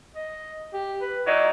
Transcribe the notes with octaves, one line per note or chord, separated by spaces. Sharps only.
D#5
G4
B4
F#3 D#4 E4 D5